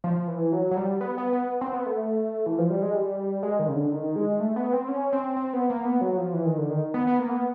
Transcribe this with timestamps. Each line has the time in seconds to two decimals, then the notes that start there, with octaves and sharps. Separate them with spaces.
0.04 F3
0.28 E3
0.52 F#3
0.71 F#3
0.77 G3
1.01 B3
1.18 B3
1.33 B3
1.61 C4
1.74 B3
1.86 A3
2.46 E3
2.58 F3
2.70 G3
2.82 G#3
2.94 G3
3.43 G#3
3.59 D#3
3.68 C#3
3.75 D3
3.92 D#3
4.16 G#3
4.40 A3
4.56 B3
4.73 C4
4.88 C#4
5.13 C4
5.36 C4
5.53 B3
5.70 A#3
5.85 B3
6.01 F#3
6.17 F3
6.33 E3
6.46 D#3
6.58 D3
6.70 D#3
6.94 B3
7.07 B3
7.19 A#3
7.31 B3